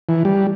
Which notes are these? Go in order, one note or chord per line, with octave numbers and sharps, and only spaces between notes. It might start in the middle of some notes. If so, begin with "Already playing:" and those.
E3
G3